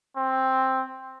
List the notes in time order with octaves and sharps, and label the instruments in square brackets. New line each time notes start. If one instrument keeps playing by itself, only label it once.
[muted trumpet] C4